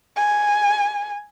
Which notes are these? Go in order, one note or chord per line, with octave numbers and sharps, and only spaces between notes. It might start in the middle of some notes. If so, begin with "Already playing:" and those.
G#5